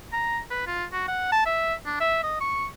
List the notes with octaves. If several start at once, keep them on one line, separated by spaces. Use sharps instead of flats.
A#5
B4
F4
F#4
F#5
A5
E5
D4
E5
D#5
C#6